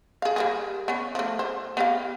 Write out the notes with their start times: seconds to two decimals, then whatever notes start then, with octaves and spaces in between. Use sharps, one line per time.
0.22 G#4 F5
0.36 G3 A#3 G#4
0.88 B3 C#4
1.15 F3 A3
1.39 C5
1.77 B3 G4 F5